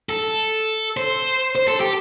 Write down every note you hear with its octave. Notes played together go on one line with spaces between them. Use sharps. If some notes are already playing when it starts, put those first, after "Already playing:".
A4
C5
C5
A4
G4